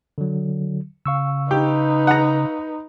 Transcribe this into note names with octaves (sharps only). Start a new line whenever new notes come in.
D3 F#3
C#3 F5 C#6 E6
D#4 G4 B4
F#5 A#5